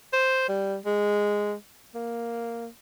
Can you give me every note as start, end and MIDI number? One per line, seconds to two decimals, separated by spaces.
0.13 0.45 72
0.49 0.76 55
0.86 1.54 56
1.95 2.68 58